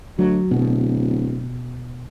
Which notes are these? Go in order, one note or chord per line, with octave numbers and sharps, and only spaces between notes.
D2 F#3
D1 B2